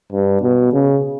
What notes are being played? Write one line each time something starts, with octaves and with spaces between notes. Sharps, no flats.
G2
B2
C#3